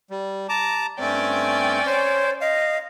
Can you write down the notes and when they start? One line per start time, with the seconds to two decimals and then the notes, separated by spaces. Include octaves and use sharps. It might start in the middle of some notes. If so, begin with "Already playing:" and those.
0.10 G3
0.49 A5 A#5 D6
0.99 G2 A3 C4 C#4 D5 G5
1.87 C5 C#5
2.41 D#5 F5